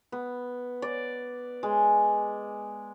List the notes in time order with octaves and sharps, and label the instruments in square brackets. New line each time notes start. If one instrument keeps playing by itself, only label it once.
[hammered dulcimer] B3
D5
G#3